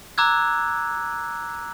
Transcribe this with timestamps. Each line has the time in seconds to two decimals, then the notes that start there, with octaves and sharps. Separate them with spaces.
0.18 A#5 D6 E6 F#6 G#6